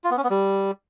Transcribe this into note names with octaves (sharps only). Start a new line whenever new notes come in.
F4
B3
C#4
B3
G3